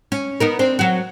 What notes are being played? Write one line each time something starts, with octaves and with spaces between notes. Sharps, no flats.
C#4
B3 D#4 A#4
C4 D4 C5
F#3 F#4